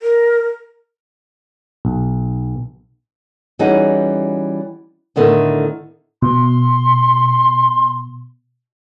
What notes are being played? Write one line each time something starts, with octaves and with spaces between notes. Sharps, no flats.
A#4
B1
E3 G3 C#4 D#4 F#4 G#4
A2 D3 D#3 A3 B3
B2 C6